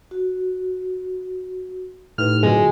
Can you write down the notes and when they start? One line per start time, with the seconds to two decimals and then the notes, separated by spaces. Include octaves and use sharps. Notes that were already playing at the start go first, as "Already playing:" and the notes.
0.11 F#4
2.18 A2 D#4 G4 B4 F6
2.43 G1 F#2 D3 G#3 B3 F4 F#4